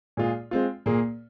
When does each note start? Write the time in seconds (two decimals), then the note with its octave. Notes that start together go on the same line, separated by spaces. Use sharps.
0.17 A#2 G#3 F4 G#4
0.51 G#3 C4 F4
0.86 A#2 A#3 G#4